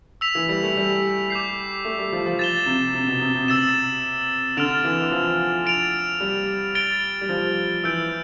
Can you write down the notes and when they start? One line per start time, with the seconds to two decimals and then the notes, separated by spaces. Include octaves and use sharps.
0.21 E6 B6 F7
0.35 E3
0.49 G3
0.63 A3
0.77 G3
1.30 D6 G6 C7
1.85 A3
1.98 G3
2.12 F3
2.26 F3
2.39 A6 E7 G7
2.66 C3
2.94 C3
3.07 B2
3.21 C3
3.35 C3
3.48 C3 E6 A6 E7
4.57 D3 F6 A6 D7 F7
4.84 E3
5.12 F3
5.66 A6 D7 F7
6.20 G3
6.75 A6 D7 G7
7.21 G3
7.29 F3
7.84 E3 E6 G6 D7